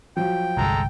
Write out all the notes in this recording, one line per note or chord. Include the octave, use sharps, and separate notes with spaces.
F3 F#3 G5
G1 C2 G#3 A4 A#5